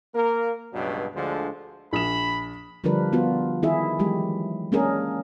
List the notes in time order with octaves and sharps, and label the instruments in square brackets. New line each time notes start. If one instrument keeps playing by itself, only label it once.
[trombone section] A#3 A#4
C#2 G2 B2 F#3
D2 D3 F3 G#3
[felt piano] A#1 D#6 E7 [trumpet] B5
[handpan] D3 F3 G3 D4 A#4 B4
B3 F4 F#4
D#3 E4 G#4 E5
E3 F#3 G#3 G4
G#3 A#3 C#4 D4 G#4 A#4